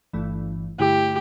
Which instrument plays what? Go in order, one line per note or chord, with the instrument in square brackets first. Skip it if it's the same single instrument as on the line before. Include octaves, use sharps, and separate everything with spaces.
[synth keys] G1 G2 E3 A3
[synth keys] G2 D3 A3 E4 [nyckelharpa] G4